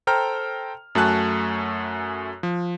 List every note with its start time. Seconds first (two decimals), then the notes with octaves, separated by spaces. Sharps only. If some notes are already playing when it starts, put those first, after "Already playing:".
0.07 A4 C5 G5 A#5 F6
0.95 F#2 A3 F#4 G#5 A5 F#6
2.43 F3